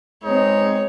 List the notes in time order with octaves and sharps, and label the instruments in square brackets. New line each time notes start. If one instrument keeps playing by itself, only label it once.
[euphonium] G#3 [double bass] B3 C4 [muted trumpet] D#4 [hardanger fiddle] C#5